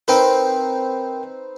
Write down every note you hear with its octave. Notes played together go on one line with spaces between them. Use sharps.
C4 D#4 A#4 B4 G5